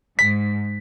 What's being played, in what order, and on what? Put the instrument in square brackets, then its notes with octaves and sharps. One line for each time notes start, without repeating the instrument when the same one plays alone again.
[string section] G#2 [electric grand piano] B6